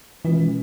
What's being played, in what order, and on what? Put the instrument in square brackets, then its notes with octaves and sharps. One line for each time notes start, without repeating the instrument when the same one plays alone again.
[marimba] B2 G#3 C#4 F4 [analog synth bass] E3